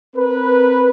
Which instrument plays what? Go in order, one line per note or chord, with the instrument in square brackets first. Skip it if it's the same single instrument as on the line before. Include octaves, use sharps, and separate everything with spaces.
[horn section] C4 A#4 B4